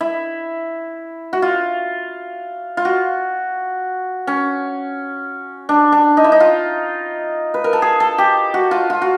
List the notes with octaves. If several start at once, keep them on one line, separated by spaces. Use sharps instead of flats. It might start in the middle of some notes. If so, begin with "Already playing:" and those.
E4
F#4
F4
F4
F#4
C#4
D4
D4
D#4
E4
D#4
F4
B4
A#4
A4
G#4
A4
G4
F#4
F4
F4
F#4